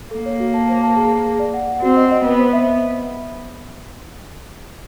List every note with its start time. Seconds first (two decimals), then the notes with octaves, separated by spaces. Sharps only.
0.11 A#3 A4
0.26 C#5
0.40 F#4
0.54 A5
0.69 C5
0.83 A5
0.97 G#4
1.11 G#4
1.25 G#4
1.39 D5
1.54 F#5
1.68 F#5
1.82 C4 F#4
1.97 D#5
2.11 D#5
2.25 B3 C5
2.39 C5
2.53 E5